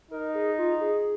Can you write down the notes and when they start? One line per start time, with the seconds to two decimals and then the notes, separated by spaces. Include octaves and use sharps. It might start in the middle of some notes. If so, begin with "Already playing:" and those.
0.11 D#4 A#4
0.34 G#4
0.58 F4
0.81 G#4